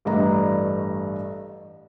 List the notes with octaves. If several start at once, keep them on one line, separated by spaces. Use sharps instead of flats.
A1 G2 A3 D4 D#5 A#5